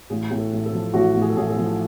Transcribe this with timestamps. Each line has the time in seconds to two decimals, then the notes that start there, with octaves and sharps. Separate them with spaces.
0.10 A1 G#4
0.30 A2 G#4
0.38 A4
0.52 A1
0.66 A4
0.73 F3
0.93 A1 F#4
1.15 A2
1.21 G#4
1.29 A4
1.36 A1 G#4
1.50 A4
1.57 F3